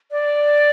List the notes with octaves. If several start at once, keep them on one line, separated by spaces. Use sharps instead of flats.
D5